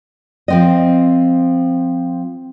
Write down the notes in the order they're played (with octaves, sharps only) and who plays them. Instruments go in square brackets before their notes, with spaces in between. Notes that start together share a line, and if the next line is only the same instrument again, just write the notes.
[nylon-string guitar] F3 C4 D#5